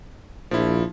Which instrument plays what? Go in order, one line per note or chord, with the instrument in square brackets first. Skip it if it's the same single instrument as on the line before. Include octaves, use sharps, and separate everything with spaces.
[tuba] A#1 [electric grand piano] F3 E4